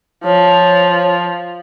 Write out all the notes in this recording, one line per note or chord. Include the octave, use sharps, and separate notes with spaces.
F3 C#5